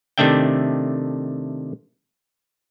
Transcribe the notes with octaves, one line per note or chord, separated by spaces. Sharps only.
C3 D#3 A3 D4 E5 G5